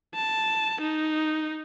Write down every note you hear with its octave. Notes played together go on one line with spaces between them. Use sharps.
A5
D#4